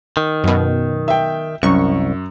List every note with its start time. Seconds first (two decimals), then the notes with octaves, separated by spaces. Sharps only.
0.17 D#3
0.44 F#2 B2
1.08 E5 G5
1.63 C2 F#2 C#6